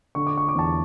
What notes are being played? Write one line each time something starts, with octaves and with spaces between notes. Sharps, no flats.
D3 C#6
D6
C#6
D6
E2 A5 C#6